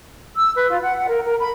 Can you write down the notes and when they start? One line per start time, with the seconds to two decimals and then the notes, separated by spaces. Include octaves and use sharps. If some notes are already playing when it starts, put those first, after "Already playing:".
0.36 E6
0.56 B4
0.70 F4
0.81 F#5
0.96 F#5
1.09 A#4
1.25 A#4
1.39 B5